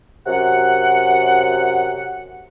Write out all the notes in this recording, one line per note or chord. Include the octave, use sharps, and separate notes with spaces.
F#2 C3 F#5